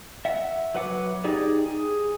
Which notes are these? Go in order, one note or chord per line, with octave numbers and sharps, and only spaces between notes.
E5 F#5
F#3 B4 F#5 D6
D#4 G4 G#4 D5
G#4